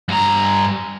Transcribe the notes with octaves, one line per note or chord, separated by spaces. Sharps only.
G2 A#5